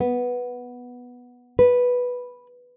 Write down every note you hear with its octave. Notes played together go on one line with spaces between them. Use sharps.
B3
B4